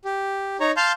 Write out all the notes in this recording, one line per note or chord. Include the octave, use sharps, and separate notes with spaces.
G4
D#4 C#5 A#5
F5 A5 C6 F6 G6